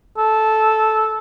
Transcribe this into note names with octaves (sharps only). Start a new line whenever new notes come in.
A4